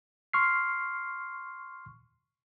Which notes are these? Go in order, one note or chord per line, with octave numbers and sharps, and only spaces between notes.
C6 C#6 F6 C7